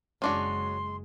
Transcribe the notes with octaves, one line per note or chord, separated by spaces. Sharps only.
F#1 G#3 C#4 D4 F#4 C6